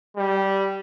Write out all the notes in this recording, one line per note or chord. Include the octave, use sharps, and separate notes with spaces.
G3